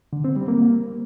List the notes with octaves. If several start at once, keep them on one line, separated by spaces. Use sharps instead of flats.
D3
C4
G3
A#3